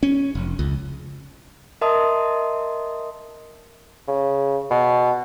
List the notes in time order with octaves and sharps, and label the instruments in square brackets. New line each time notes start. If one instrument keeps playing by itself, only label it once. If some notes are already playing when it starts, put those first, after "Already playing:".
[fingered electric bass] C#4
F1
C#2
[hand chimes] A#4 D#5 E5 A5 C6 D#6
[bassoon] C#3
B2